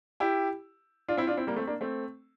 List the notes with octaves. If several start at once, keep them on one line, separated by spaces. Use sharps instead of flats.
E4 G4
D4 F4
C4 E4
D4 F4
C4 E4
G3 A#3
A3 C4
A#3 D4
A3 C4